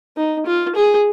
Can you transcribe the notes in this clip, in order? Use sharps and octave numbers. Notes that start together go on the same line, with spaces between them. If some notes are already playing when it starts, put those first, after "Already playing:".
D#4
F4
G#4